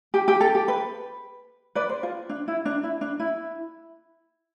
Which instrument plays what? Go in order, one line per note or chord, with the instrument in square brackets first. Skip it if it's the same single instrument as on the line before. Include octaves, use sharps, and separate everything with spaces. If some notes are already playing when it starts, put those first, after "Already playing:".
[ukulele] G4
G4
A4
G4
B4
B4 D5
C5
F4
D4
E4
D4
E4
D4
E4